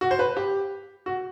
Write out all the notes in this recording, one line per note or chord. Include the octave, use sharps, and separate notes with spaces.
F#4
C5
B4
G4
F#4